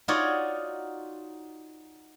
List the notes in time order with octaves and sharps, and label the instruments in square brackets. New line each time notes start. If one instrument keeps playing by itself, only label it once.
[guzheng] D#4 F4 F#4 C#5 D5